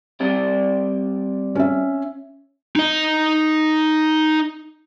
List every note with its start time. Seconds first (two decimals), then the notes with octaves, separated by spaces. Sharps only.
0.20 G3 C4 D5
1.55 C#4 E5
2.76 D#4 D#5